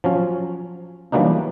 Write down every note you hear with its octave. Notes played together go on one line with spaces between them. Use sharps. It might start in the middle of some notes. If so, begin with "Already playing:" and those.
F3 F#3 C#4
E3 F#3 G3 A#3 D4 D#4